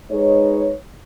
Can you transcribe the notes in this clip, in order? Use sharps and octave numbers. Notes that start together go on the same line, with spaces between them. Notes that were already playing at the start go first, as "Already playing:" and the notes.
G#3 D#4 B4 C#5